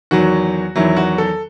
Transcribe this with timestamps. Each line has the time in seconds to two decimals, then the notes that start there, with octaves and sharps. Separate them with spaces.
0.11 E2 D#3 F#3 F#4
0.76 E2 D#3 F#3 E4
0.96 F#4
1.18 A4